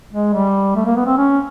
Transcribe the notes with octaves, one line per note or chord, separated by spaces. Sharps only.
G#3
G3
A3
A#3
B3
C4
C#4